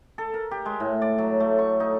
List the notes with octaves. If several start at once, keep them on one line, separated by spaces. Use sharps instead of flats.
A4
A#4
G4
G#3
A2
D5
F#3
A3
C#6
D#4